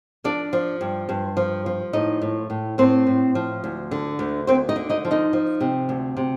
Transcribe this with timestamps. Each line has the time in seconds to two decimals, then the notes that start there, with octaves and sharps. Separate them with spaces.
0.24 F3 D4 D5
0.53 F3
0.81 G2
1.09 G2
1.37 F3
1.66 F3
1.93 A2 D#4 D#5
2.22 A2
2.50 A2
2.78 A2 C4 C5
3.07 A2
3.35 F3
3.64 D2
3.91 D3
4.19 D2
4.47 D2 C4 C5
4.69 D#4 D#5
4.76 D3
4.90 D#4 D#5
5.05 F3
5.11 D#4 D#5
5.33 F3
5.61 C3
5.89 D2
6.17 C3